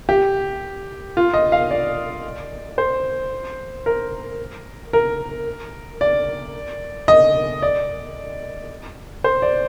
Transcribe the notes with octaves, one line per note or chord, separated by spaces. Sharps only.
G4
F4
D#5
F5
D5
C5
A#4
A#4
D5
D#5
D5
C5
D5